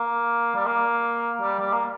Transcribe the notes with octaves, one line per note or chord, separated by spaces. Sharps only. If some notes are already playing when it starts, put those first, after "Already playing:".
Already playing: A#3
G3
A#3
G3
G3
A#3